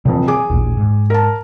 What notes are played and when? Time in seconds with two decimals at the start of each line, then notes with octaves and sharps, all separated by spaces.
0.05 D#1 F2 C3 E3
0.28 G#4 G#5 D6
0.50 A1 D#2 A#2
0.77 G#2
1.10 A#4 A5